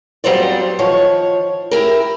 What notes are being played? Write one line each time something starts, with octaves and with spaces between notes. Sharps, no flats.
F2 F#3 G3 B3 C5 D5
D#3 F3 C#5
E4 G4 A#4